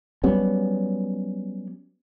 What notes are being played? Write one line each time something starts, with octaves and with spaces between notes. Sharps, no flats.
F#3 G3 B3 C#4